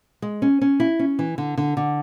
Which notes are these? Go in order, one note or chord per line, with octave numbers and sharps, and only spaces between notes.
G#3
C#4
C#4
E4
C#4
E3
D3
D3
D3